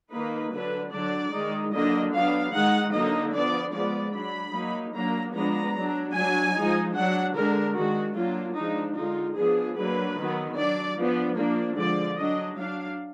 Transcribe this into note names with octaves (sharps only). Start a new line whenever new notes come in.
D#3 A#3 D#4 B4
D3 F#3 D4 B4
D3 F#3 D4 D5
D#3 G#3 D#4
D3 F#3 A#3 D4 D#5
F#3 B3 D4 F5
D#3 G#3 D#4 F#5
D3 F#3 A#3 D#4 D#5
F3 B3 D4 D5
F3 G#3 B3 D5
F#3 D4 B5
F#3 A#3 D#4
F#3 A#3 D4 A#5
F3 G#3 B3 D4 A#5
F#3 D4
F#3 D4 G#5
F3 G#3 D#4
F#3 D4 F#5
D3 G#3 D4 A#4
D#3 G#3 D4 F#4
F#3 A#3 D4 F4
F3 G#3 D4 D#4
D3 G#3 D#4 F4
F3 B3 D4 G#4
F#3 A#3 D4 B4
D#3 F#3 B3
F#3 D4 D5
F3 B3 D4
F3 A#3 D4
D3 F3 G#3 D5
F#3 D4 D#5
F#3 D4 F5